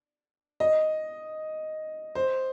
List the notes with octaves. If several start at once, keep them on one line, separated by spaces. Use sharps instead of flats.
D#5
C5